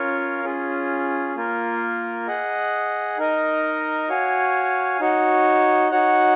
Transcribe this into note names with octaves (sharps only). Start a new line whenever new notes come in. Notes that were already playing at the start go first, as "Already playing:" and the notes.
Already playing: C#4 F4 A#4 C#5 F5
C#4 F4 G#4
A#3 F4 A#4
G#4 D#5 F#5
D#4 A#4 D#5
F#4 C#5 F5 G#5
D#4 F#4 C#5
D#4 F#4 C#5 F#5